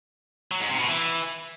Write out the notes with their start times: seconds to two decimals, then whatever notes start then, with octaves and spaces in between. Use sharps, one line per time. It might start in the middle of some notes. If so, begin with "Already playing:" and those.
0.51 F#3
0.61 G#2
0.70 C3
0.79 B2
0.88 E3